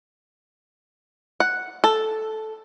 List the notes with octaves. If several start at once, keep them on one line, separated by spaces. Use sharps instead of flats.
F#5
A4